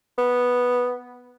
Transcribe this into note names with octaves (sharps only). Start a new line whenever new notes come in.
B3